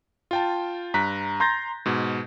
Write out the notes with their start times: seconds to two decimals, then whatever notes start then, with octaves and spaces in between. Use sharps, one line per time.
0.31 F4 G5 A5
0.94 G2 A#5 F#6 B6
1.40 A#5 C6 G6 A6 A#6
1.86 G#2 B2